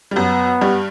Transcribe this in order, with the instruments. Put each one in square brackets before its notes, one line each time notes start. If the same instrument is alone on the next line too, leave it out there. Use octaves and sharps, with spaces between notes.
[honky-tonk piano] G3
[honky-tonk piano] F#2 F#3 [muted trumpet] B3
[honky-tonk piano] G2 G3